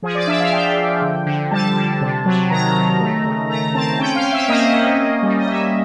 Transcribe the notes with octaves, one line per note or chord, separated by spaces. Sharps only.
F3 G#4
D5
D4 E5
F5
F3 G5
F3
D3
D3
G3 A5
D3
C3
F#3
D#3 A#5
D#3
A3
C#3
A3 A#5
C4 A5
C#4 G5
F5
C#4
E5
A#3 D#5
C#4
A#3
G3
D#5
C#4 E5